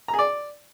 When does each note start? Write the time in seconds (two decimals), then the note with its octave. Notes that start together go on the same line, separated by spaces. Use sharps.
0.08 A#5
0.14 G#4
0.19 D5